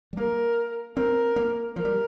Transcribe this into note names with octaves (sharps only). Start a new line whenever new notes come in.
G3
A#3 A#4
C4 A#4
A#3
F3 A#4
G3